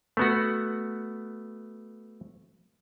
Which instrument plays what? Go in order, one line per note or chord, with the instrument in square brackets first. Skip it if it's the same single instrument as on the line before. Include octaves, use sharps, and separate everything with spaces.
[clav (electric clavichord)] A3 B3 F#4